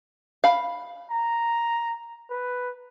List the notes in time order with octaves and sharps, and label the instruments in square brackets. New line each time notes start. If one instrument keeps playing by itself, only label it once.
[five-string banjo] F5 B5
[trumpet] A#5
B4